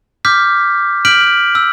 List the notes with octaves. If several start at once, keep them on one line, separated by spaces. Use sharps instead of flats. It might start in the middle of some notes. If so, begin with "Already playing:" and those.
D6 F6 G6 B6
F6 G6 B6 D7 F#7
E6